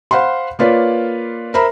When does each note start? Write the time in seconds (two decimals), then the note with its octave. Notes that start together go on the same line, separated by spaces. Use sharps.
0.11 C5 F5 F#5 B5 C6
0.59 A#3 F4 B4 C#5 D5
1.54 A#4 C5 E5 A#5 B5